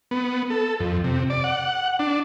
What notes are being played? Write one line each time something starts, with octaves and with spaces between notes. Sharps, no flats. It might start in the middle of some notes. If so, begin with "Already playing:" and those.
B3
A4
F2
C3
D5
F#5
D4